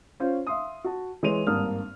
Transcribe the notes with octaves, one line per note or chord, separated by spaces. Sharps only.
C#4 F4 C5 C#5
E5 F5 C6 D#6
F#4 A5
E3 G#3 C#5 C6 D#7 F7
G#1 G2 A#3 A5 D#6 F6